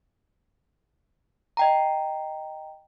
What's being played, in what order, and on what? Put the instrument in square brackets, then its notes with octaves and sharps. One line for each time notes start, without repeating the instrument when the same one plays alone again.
[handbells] D#5 G5 A#5